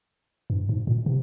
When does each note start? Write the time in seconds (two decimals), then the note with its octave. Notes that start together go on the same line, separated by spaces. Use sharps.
0.50 G2
0.69 G#2
0.87 A#2
1.06 C3